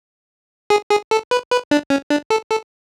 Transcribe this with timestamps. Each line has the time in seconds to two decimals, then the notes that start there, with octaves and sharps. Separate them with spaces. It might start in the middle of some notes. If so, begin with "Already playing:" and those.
0.70 G#4
0.90 G#4
1.11 A4
1.31 B4
1.51 B4
1.71 D4
1.90 C#4
2.10 D4
2.30 A4
2.50 A4